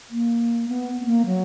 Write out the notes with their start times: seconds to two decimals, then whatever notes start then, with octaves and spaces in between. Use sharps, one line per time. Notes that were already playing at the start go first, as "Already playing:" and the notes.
0.11 A#3
0.69 B3
1.00 B3
1.06 A#3
1.26 F#3